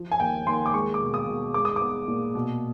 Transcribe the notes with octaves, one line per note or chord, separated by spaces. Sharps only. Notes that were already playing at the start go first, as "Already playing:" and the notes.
Already playing: F3
G#5
D#2 G5
D#2 C6
D6
G#3 C#6
D6
B2
D#6
B2
G#3 D6
D#6
B3 D6
A#2
B2